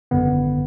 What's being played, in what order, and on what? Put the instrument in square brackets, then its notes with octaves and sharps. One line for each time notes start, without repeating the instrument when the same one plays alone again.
[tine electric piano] G#1 F#2 D3 B3